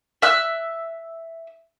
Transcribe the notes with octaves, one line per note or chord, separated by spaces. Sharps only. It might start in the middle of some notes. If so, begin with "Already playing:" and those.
E5 E6 F#6